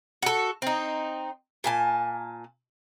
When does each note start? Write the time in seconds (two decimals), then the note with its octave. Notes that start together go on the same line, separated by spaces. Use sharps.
0.22 F#4 A4
0.62 C4 D#4
1.64 A#2 G#5 A5